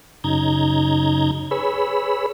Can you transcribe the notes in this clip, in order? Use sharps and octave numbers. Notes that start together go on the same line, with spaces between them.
F#2 C#3 D#4 A#5 G6 G#6
G#4 B4 C#5 B5 E6